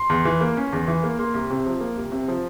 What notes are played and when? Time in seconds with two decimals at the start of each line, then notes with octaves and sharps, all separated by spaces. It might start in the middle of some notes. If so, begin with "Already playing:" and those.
Already playing: C6
0.09 E2
0.25 E3
0.41 A#3
0.57 C#4
0.73 E2
0.88 E3
1.03 A#3
1.19 A#3 C6
1.34 C2
1.50 C3
1.66 F3
1.81 A#3
1.97 C2
2.12 C3
2.28 F3